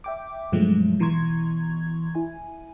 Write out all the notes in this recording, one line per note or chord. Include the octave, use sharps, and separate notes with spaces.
E5 G5 D6
G2 B2 F3 F#3 G#3 A3
B2 E3 A#5 C6 C#6 G#6
E4 G#5